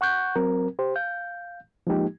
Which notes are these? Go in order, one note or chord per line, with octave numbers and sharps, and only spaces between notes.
F#5 C#6 F#6 G6
F#3 C4 A#4
G4 C5
F5 G6
F3 G#3 A#3 D#4 G4